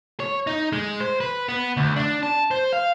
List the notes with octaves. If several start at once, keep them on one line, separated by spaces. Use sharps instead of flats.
C#5
D#4
G#3
C5
B4
B3
D2
D4
A5
C5
F5